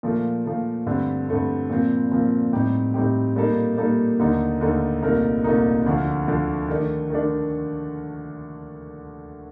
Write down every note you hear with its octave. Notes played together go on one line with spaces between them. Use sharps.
A#2 F3 A3
A#2 F3 A3
G2 D3 A3 C4
G2 D3 A3 C4
A#2 F3 C4
A#2 F3 C4
A2 G3 C4 D#4 G4
A2 G3 C4 D#4 G4
A#2 G3 A#3 D#4 A4
A#2 G3 A#3 D#4 A4
D#2 D3 A3 D#4
D#2 D3 A3 D#4
C2 A#2 A3 D#4 A#4
C2 A#2 A3 D#4 A#4
D2 D3 F3
D2 D3 F3
D#3 A3 D4
D#3 A3 D4